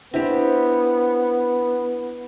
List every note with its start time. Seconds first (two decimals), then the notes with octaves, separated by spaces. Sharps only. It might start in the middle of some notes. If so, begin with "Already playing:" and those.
0.14 B3 C4 D4 E4 G4